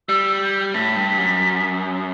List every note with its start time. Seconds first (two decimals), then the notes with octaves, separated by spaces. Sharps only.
0.09 G3 E6
0.42 G6
0.74 A2 B6
0.96 G2
1.18 F#2